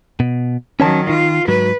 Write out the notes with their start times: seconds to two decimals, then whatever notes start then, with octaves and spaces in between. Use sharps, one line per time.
0.20 B2
0.80 D#3 F#3 C#4 C#5 A5
1.09 D#3 F4
1.48 G#2 F#3 B4